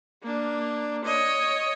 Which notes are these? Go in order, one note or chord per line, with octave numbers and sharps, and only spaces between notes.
A#3 D4
C#5 D#5